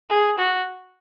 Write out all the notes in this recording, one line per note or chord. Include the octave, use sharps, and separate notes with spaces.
G#4
F#4